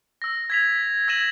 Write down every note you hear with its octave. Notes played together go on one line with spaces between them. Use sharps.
E6 A#6
G#6 B6 F7
E6 G#6 A#6 D#7 E7 F#7